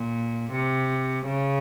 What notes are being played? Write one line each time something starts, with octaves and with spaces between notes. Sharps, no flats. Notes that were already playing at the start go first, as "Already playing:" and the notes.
Already playing: A#2
C3
C#3